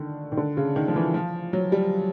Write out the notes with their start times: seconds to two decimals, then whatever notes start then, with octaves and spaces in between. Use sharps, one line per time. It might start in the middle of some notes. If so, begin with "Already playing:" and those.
Already playing: D3 D#3
0.32 D#3
0.37 D3
0.57 C#3
0.76 D#3
0.88 F3
0.96 E3
1.14 F3
1.53 F#3
1.72 G3